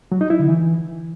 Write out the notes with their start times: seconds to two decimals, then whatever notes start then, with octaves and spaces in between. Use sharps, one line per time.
0.12 F#3
0.21 D#4
0.30 E4
0.39 D3
0.49 E3